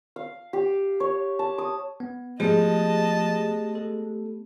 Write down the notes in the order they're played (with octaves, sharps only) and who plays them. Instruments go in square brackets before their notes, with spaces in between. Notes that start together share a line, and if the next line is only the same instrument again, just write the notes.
[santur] F5
G4
C#5
A5
D#6
[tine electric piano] B3
[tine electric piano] F3 [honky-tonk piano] G#3 [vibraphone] A3 B3 G4 [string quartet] D#5 A5
[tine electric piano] A4